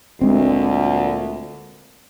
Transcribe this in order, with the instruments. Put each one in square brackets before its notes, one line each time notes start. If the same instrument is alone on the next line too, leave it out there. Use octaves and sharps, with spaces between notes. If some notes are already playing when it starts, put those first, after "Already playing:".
[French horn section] D2 A#2 [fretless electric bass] G#3 C4